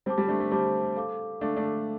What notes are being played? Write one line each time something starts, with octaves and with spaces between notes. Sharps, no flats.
G3 C4 G4 C5 A5 D6
G3 C4
A3 D4
A3
G3 C4 G4 C5 A5 D6
A4 F5 D6
A3 D4 A4 F5 D6
A3 D4